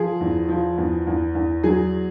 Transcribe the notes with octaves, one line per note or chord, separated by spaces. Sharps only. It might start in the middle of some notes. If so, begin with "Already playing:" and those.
Already playing: F3 G#4
E2
F3
E2
E2
E2
F#3 G#4